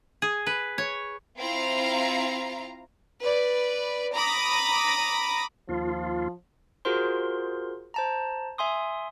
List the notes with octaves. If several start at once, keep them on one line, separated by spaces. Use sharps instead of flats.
G#4
B4
C#5
C4 E4 F4 F5 A#5
B4 D5
A#5 B5 D6 D#6 A#6
D#2 F3 F4
F4 F#4 G#4 A#4 C5 C6
C5 A5 A#5
E5 G#5 C6 D#6